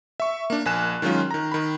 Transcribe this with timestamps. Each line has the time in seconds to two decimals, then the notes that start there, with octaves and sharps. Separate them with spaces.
0.20 E5 C#6
0.50 A#3 D4
0.65 A#1 A#3 G#5 F#6 E7
1.02 D#3 F#3 G#3 C#4 F4
1.31 D#3 A#5
1.52 D#3 B5